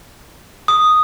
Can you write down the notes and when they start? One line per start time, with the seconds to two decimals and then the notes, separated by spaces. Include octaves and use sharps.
0.68 D#6